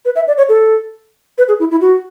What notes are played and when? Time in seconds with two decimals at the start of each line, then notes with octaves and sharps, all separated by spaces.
0.05 B4
0.16 E5
0.27 D5
0.37 C#5
0.49 A4
1.38 B4
1.48 G#4
1.60 E4
1.71 E4
1.81 F#4